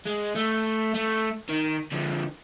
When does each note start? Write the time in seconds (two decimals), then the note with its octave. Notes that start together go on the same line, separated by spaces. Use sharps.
0.07 G#3
0.36 A3
0.95 A3
1.49 D#3
1.92 D3 F3